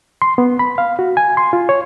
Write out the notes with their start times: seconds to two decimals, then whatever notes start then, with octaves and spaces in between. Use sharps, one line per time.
0.22 C6
0.38 B3
0.59 B5
0.78 F5
0.99 F#4
1.17 G#5
1.37 C6
1.53 F4
1.69 C#5